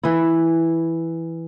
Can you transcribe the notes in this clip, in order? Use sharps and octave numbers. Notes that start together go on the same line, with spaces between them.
E3 E4